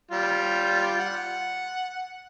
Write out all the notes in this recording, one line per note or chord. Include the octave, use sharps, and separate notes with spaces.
G3 F4
F#5